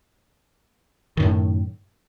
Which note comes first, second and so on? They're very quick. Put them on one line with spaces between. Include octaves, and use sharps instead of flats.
D#3 F#2 A2